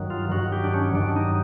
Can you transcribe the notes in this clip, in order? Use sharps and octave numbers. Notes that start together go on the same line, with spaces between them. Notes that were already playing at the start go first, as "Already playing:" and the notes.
Already playing: G2 D#3 F#3
F4
G2 D#3 F#3 F#4
G4
D4
C#4
G2 D#3 F#3 D4
D#4